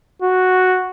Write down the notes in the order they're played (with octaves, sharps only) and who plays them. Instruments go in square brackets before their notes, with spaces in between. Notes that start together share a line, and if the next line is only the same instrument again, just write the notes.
[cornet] F#4